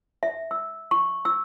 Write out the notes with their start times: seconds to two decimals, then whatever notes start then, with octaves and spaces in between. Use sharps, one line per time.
0.23 E5
0.51 E6
0.91 C#6
1.25 E6